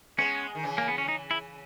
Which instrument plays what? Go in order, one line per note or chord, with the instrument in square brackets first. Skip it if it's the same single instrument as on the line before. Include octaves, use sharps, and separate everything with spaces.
[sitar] G#3 B3 [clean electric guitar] C#4
[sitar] D#3
C#3 E3
[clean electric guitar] A#3
B3
C#4
D#4
E4